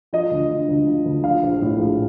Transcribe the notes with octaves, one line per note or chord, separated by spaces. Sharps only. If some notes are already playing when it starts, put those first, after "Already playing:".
F3 D#5
D2
D3
D2
F3
D2
F3 F5
A#1
A2
A#1